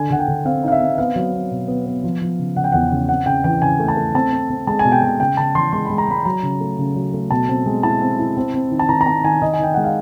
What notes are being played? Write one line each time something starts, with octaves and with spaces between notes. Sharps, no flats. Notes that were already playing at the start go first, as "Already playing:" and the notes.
Already playing: D3 G#5
D3 F#5
G5
D3
C4 F5
D#4 F5
E5
C4
B3 F5
F#3
B3
B2
B3
B3
F3
F3
C#3
C#3 F#5
G5
E2 F#5
C#3
C4 F#5
C#3 G5
E3 G5
C#3 G#5
A3
A5
A3
C4 A5
C4
C4
G#3 A5
G#5
B2
G5
B2 G#5
C#3 G5
C#3 A5
E3 C6
G#3 C6
G#3 B5
A#5
G#3 B5
F#3 A#5
C#3
A3
C#3
F#3
A3
B2 A5
C4
G#3
E4 A5
C4
E4
C4
C4
D#3
A5
D#3 A#5
A#5
C4 A5
D#3 G#5
D#3 D#5
G#5
D#3 G5
G#3 F#5
F5